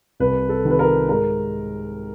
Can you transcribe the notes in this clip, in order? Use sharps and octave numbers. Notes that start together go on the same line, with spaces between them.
C2 B4
A4
C3 D#3
B4
A#4
G#2 A#4